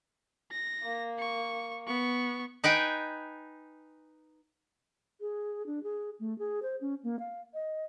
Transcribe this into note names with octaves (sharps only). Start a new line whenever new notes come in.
A#6
A#3
C#6
B3 C#6
D#4 B4 G5 G#5
G#4
D4
G#4
A3
G#4
C5
C#4
A#3
F5
D#5